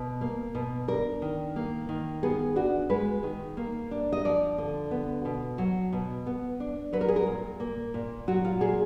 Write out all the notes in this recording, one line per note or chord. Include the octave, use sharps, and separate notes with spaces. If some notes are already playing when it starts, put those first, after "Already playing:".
Already playing: B2
A#3
B2
D4 A#4
D#3
A#3
D#3
B3 G#4
D4 F#4
G#3 B4
D#3
A#3
D4
D#5
F3 D5
D3
B3
B2
F#3
B2
B3
D4
F#3 B4
A#4
G#4
A#4
A#2
A#3
A#2
F#3 F#4
F4
A#2 G#4